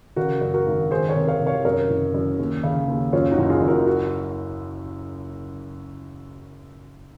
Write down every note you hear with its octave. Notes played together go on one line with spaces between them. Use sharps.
C#3 F#4 A#4
F#2
F#4 A#4
G#1
D#3 G#4 C5
A#4 C#5
C3
C#5 F5
C3
C#5 F5
F#2 A#4 C#5
F#1
F#2
D#2
C#3
D#2
F#2 C#4 F4
D#4 F#4
F#1
F4 G#4
F#2
F#4 A#4
F#4